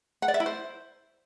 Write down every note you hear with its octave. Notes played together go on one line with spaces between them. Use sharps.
F#5
D5
E5
E4
C5